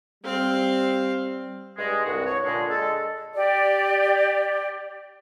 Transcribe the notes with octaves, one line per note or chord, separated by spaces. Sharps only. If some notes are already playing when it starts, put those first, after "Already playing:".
G3 C4 F5
G2 G#3
C2 G2 F#4
C#5
A#2 D3 G#3
G#3 A4
G4 D5